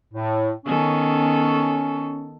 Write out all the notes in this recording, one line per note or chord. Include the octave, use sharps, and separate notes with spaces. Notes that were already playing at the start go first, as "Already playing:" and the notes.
A2
D#3 B3 C#4 A4